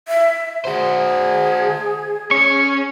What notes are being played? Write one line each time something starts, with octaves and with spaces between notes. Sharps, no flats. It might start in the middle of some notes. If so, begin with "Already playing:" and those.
E5
F#4 G#4 C5
C#4 C#6